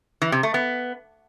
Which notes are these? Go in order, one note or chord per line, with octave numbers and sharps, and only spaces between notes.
E3
C3
A3
B3